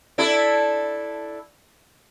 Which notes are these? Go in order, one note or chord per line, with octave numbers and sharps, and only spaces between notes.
D4 E4 A4